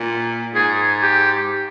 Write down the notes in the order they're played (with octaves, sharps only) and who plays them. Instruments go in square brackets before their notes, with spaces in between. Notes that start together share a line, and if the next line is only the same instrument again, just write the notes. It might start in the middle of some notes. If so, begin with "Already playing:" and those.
Already playing: [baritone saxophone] A#2
[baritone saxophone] G#2 [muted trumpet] G#4
[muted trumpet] G4